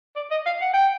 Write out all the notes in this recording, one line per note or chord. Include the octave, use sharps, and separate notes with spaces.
D5
D#5
F5
F#5
G5